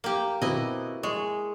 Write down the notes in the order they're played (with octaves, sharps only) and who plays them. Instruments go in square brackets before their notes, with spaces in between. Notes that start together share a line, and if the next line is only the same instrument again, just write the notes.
[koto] A#3 G4
[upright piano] B2 C4 [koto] E4 D#5
[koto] G#3 [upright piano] C#6